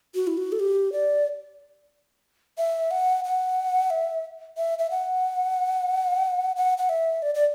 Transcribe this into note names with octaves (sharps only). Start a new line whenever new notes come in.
F#4
E4
F#4
A4
G4
D5
E5
F#5
F#5
E5
E5
E5
F#5
F#5
F#5
E5
D5
D5